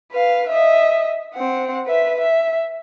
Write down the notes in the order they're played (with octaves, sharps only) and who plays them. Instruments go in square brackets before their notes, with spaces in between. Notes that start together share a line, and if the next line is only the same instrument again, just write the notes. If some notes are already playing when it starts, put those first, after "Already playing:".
[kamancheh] B4 F5
D#5 E5
C4 F#5
B4 E5
E5